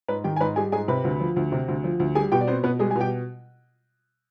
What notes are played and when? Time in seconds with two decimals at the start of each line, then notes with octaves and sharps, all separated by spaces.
0.08 G#2 B4 B5
0.24 D#3 G4 G5
0.36 G#5
0.40 G#2 B4 B5
0.56 G3 G#4 G#5
0.72 G#2 G#4 G#5
0.88 C3 B4 B5
1.04 D2
1.20 F3
1.36 D2
1.52 C3
1.68 D2
1.84 F3
2.00 D2
2.15 G3 G#4 G#5
2.32 B2 G4 G5
2.41 D5
2.47 B3 C4 C5
2.63 B2 B3 B4
2.79 G3 G#3 G#4
2.91 B2 G#5
3.01 G4 G5